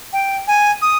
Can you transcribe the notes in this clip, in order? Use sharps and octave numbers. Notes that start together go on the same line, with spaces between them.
G5
G#5
D#6